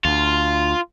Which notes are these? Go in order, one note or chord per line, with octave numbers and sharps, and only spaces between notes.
D2 F4